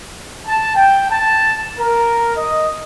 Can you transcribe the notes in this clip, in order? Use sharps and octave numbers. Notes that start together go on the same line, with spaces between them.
A5
G5
A5
A#4
D#5